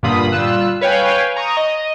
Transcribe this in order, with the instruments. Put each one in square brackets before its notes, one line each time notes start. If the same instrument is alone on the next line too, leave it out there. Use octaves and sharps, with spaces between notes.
[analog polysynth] G2 A#2 D3 F4 B5 D#6
G3 F4 E6 F#6
B4 C#5 F5 G5 G#5
A#5 C#6 D#6
D#5